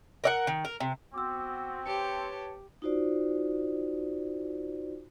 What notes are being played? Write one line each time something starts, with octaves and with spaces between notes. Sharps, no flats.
A#4 D5 F#5
D#3
A#4
C3
B3 C4 F#4 D6 E6
G4 B4 C#5 A5 C#7
D#4 F4 F#4 C5 D5